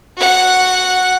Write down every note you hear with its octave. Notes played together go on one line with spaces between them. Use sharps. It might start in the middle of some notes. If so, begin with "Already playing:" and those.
F#4 F#5